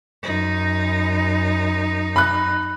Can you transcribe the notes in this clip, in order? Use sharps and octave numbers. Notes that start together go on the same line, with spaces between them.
F#2 D#4
B5 F#6